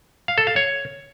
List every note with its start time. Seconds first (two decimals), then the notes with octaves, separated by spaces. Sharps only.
0.28 F5
0.38 A4
0.47 F5
0.56 C#5